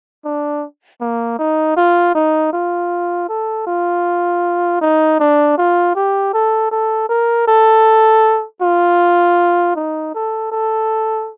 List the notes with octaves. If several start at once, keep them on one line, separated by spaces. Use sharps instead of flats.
D4
A#3
D#4
F4
D#4
F4
A4
F4
D#4
D4
F4
G4
A4
A4
A#4
A4
F4
D#4
A4
A4